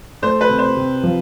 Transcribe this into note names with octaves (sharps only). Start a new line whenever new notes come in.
A3 C5
B4
C3
C5
C3
F3